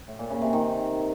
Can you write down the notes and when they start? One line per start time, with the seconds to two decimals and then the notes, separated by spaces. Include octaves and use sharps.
0.08 A2
0.19 A#2
0.30 C#3
0.42 C3
0.53 D#3